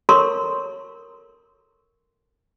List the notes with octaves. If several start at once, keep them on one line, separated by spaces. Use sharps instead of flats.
A4 A#4 C#5 C6 C#6